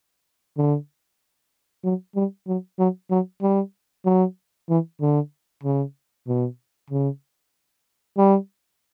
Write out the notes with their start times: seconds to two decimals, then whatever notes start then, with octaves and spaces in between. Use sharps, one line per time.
0.57 D3
1.84 F#3
2.16 G3
2.47 F#3
2.79 F#3
3.10 F#3
3.42 G3
4.05 F#3
4.69 E3
5.01 D3
5.64 C#3
6.28 B2
6.90 C#3
8.17 G3